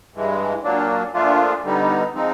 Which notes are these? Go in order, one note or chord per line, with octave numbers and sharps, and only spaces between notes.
G2 E3 G#3
A#2 F#3 A#3 D4
A#2 F3 A3 D4 F4
D3 G3 B3 D#4
F3 G#3 C4 D#4